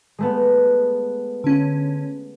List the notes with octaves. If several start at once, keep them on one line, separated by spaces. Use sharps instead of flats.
G#3 A3 B3
D3 C#4